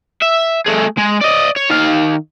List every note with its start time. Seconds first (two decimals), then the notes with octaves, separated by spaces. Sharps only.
0.22 E5
0.66 A3 G#4
0.97 G#3
1.21 D5 D#5
1.57 C#5
1.70 D#3 F5